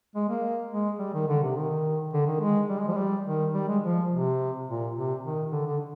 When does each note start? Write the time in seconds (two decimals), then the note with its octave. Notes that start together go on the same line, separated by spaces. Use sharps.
0.15 G#3
0.29 A#3
0.71 G#3
0.99 G3
1.14 D#3
1.28 D3
1.42 C3
1.56 D#3
2.13 D3
2.27 D#3
2.41 G#3
2.69 G3
2.79 G#3
2.88 F3
2.93 G#3
2.97 G3
3.26 D#3
3.54 G3
3.68 G#3
3.83 F3
4.11 C3
4.68 A#2
4.96 C3
5.24 D#3
5.52 D3
5.66 D3